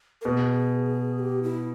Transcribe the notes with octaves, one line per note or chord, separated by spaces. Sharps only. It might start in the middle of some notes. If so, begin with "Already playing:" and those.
A#4
B2 G#4
G4
E4